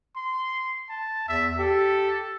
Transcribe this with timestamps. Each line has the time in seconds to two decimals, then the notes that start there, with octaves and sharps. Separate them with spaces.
0.16 C6
0.89 A5
1.28 E2 E5
1.58 G4 A4